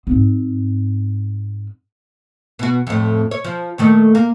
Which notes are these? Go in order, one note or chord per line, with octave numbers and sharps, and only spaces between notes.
G#2 C4
B2 F#4
F2 A2
C#5
F3
A#2 D#3 A3
A#3